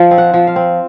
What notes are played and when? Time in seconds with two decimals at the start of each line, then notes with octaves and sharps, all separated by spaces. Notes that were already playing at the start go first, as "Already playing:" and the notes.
Already playing: F3 D#5
0.11 C4
0.18 F#5
0.34 F3
0.47 F5
0.56 C4